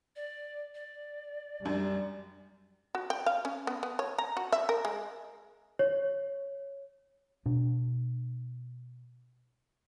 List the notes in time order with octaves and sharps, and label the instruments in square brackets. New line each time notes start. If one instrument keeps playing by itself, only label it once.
[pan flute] D5
D5
[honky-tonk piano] F#2 D4 [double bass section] G3
[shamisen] F#4
G5
F5
C#4
B3
B3
C#5
A#5
F#4
E5
A#4
G#3
[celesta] C#5
[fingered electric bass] B2 D4